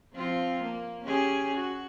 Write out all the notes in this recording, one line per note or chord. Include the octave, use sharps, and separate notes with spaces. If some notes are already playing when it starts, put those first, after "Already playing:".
F3 C4 F4
A#3
C#4 G4 G#4
F#4